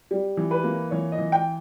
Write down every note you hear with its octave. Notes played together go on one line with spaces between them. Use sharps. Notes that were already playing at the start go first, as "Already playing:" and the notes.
G3
E3
B4
A#3
E3 C#5
D#5
E3
G5